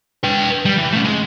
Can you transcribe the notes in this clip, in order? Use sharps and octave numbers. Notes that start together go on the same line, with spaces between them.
B4 G5
G3
E3
A3 C#4
G#3